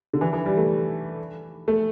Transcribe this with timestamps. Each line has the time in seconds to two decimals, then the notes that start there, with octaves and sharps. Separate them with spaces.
0.13 D3
0.21 E3
0.33 E3
0.46 G3
0.57 A3
1.68 A3